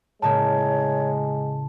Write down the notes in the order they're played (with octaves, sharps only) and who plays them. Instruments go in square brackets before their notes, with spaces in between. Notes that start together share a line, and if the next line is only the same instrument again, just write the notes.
[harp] A2 C#3 A#3 [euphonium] G#3 [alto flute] C#5 [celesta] A5